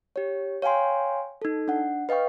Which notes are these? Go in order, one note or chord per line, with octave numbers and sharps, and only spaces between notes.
G4 C#5
C#5 F5 G5 G#5 C6
D#4 A4
D4 F#5
B4 D#5 F5 G5 C#6